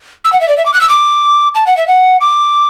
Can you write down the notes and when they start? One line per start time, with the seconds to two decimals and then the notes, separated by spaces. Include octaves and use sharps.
0.25 E6
0.33 F#5
0.41 E5
0.49 D5
0.58 E5
0.66 D6
0.74 F#6
0.81 E6
0.89 D6
1.55 A5
1.67 F#5
1.77 E5
1.88 F#5
2.21 D6